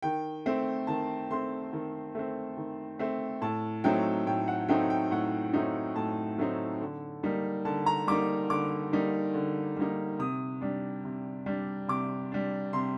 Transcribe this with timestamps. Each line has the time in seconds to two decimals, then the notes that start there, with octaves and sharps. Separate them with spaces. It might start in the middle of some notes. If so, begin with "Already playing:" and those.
0.02 D#3 G5
0.46 A3 C4
0.87 D#3 A5
1.31 A3 C4 C6
1.73 D#3
2.15 A3 C4
2.57 D#3
2.99 A3 C4
3.42 A2 A5
3.84 F#3 A3 C4 D#4 G5
4.27 A2 G5
4.48 F#5
4.68 F#3 A3 C4 D#4 G5
4.90 G5
5.11 A2 F#5
5.53 F#3 A3 C4 D#4
5.96 A2 A5
6.38 F#3 A3 C4 D#4
6.80 D3
7.23 G3 A#3 D#4
7.65 D3 A5
7.86 A#5
8.07 G3 A#3 D#4 D6
8.50 D3 D6
8.92 G3 A#3 D#4
9.34 D3
9.76 G3 A#3 D#4
10.19 C3 D#6
10.61 G3 D4
11.05 C3
11.46 G3 D4
11.88 C3 D6
12.32 G3 D4
12.73 C3 C6